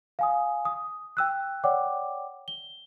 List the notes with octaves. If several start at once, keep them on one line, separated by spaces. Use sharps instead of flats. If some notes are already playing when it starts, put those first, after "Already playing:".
F5 G#5 D#6
D#6
G5 E6 F#6
C#5 D5 F#5 G5 D6
G7